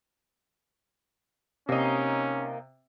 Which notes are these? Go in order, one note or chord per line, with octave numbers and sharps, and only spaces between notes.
C3 A#3 C#4 D#4